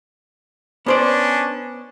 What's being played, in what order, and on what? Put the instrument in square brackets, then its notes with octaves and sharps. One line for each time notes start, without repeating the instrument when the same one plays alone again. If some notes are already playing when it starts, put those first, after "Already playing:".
[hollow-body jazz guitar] B3 C5 D5 [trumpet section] C#4 D4